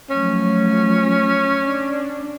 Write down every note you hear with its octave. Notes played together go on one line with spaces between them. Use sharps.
F3 F#3 A3 C#4
D4